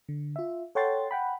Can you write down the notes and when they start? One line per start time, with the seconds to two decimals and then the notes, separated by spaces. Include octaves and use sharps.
0.09 D3
0.36 F4 E5
0.75 A4 C#5 F#5 G5 C6 A6
1.11 F#5 G5 B5